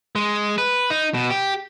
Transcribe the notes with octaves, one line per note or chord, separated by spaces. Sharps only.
G#3
B4
D#4
B2
G4